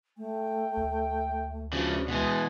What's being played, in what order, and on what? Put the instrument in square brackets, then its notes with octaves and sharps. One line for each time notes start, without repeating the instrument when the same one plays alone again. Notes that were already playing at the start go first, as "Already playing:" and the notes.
[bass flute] A3 [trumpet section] G5
[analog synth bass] D2
[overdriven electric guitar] C#3 F3 [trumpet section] D4 [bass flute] F#4
[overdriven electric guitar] B2 E3 [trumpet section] G#3